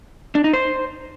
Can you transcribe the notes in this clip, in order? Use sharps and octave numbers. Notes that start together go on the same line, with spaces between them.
D4
D#4
C5